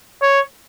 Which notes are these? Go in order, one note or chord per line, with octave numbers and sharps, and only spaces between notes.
C#5